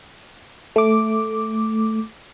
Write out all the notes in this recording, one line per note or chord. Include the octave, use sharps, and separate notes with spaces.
A3 D6